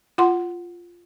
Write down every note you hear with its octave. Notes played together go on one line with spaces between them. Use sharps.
F4 F#5 C6